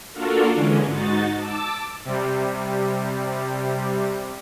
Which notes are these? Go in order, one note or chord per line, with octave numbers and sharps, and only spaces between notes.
A#3 D4 F4 F#4 A4 A#4
D3 E3 G#3 C#4
G#2 D#4 F#4 A6
A5 D6 E6
C3 G3